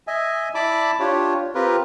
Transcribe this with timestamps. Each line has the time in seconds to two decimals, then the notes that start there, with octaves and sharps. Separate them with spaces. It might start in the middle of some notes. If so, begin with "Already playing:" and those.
0.07 D#5 E5 G#5
0.55 E4 D5 A5 B5 D6
1.00 D4 F4 G4 C#5
1.55 C4 F4 G4 A#4 B4